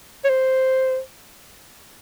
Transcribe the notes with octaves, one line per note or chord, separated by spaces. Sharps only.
C#5
C5